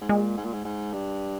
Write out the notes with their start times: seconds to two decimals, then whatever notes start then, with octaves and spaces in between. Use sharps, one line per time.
0.01 G#2
0.09 A#2 G#3
0.37 G#2
0.44 A#2
0.53 G#2
0.65 G#2
0.93 G2